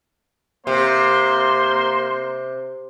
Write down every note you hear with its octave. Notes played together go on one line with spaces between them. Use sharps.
C3 A#3 C5 C6